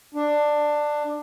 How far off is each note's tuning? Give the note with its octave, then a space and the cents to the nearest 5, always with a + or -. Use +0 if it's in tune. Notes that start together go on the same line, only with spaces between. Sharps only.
D4 +15